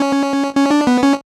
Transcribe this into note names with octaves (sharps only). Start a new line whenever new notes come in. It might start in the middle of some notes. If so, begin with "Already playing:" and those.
Already playing: C#4
C#4
D4
B3
C#4